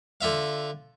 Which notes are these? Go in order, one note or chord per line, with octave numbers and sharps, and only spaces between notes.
D3 F4 E5 F5